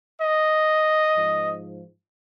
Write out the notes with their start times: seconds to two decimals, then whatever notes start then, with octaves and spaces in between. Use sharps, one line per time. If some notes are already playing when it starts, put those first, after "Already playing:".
0.21 D#5
1.17 G#2 F3